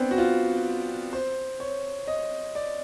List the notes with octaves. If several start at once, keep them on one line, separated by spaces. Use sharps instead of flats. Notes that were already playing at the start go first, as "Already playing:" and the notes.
Already playing: B3 C4 D4
F#4
F4
C5
C#5
D#5
D5